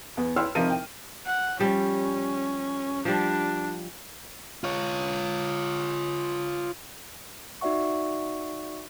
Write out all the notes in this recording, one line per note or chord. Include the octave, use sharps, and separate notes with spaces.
E2 B3
B4 C#5 G5 C6 E6 F6
G#1 C3 F3 D#4 A#4 D#7
G5
F#5
F3 G3 C#4
F3 G3 D4
F4 C#5
D#4 F#4 D5 E5 F#5 C#6